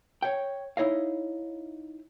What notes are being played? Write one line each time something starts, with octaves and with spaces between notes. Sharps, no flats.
C#5 G5
D#4 E4 C#5 D#5 F5